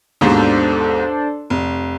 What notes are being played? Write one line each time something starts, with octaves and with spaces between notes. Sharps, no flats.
D#2 G#2 B2 D4 A4 C5
F1